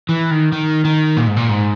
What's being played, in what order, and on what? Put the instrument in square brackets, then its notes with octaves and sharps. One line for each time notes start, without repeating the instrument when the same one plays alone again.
[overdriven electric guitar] E3
D#3
D#3
D#3
A#2
G#2
A#2
G#2